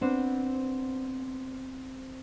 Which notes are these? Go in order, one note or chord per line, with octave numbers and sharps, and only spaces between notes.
B3 C4 D4 C5